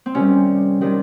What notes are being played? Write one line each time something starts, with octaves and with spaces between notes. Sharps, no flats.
C4
C3 D#3 G3 C#4
C3 D#3 G3